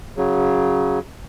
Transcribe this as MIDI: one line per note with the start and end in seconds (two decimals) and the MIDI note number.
0.17 0.99 49
0.17 0.99 54